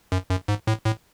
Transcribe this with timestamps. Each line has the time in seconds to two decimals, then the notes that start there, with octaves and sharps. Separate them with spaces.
0.12 F#2
0.30 F#2
0.48 G#2
0.67 A2
0.85 A2